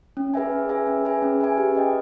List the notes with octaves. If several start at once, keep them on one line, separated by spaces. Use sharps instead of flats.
C#4
G#4 B4 E5 G#5
C#4
G#4 B4 E5 G#5
C#4
G#4 B4 E5 G#5
C#4
G#4 B4 E5 G#5
G4
B4 D#5 G5